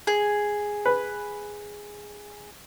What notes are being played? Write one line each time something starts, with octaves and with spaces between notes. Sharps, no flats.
G#4
B4